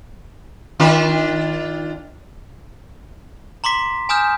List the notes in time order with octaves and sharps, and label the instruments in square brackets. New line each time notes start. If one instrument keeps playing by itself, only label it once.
[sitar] D#3 D4 F4
[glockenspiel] A#5 C6 D6 B6
G#5 A#5 D#6 F6 G6 E7